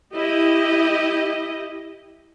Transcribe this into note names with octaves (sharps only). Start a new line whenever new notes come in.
E4 G4 D#5